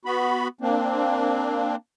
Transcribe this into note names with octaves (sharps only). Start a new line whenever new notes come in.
B3 F#4 B5
A#3 C4 D4